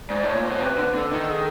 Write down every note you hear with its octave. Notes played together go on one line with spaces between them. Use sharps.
G#2 D5
A2 C#5
A#2
B2 C5
C3 B4
D3
D3 A4
D#3
G#4